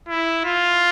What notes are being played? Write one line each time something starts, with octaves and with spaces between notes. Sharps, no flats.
E4
F4